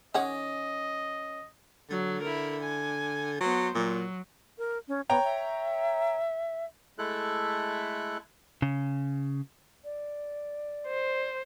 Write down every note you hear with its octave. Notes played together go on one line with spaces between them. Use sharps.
D#3 C#4 G#4 D#5 F#5 D6
D3 F#3
E4 A#4
G#5
F#3 B3 C5
A#2 F#3
A#4
C#4
B3 C#5 G5 A#5
E5
G#3 A3 E4 A4 F#6
C#3
D5
C5